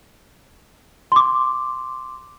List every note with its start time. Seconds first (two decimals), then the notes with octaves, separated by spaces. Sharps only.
1.12 C6 D6